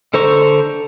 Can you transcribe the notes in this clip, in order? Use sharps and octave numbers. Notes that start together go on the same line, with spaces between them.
D3 A4 C5 A#5 C#6